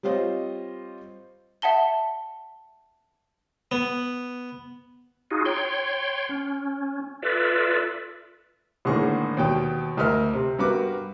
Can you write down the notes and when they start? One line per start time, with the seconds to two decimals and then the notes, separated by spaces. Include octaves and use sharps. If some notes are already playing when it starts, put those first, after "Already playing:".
0.03 G3 C4 F4 C5 C#5 D#5
1.62 E5 F#5 A5 G7
3.71 B3
5.31 D#4 F4 F#4 G#4
5.45 C#5 G5 C6
6.29 C#4
7.22 F4 A4 B4 D5 E5
8.85 G#1 A2 D3 A#3 G#4 C#6
9.37 D#2 B2 G5
9.97 D2 A#4 D#5 E5 F6
10.34 C3
10.59 G2 B3 F#4 A#4 B4 D6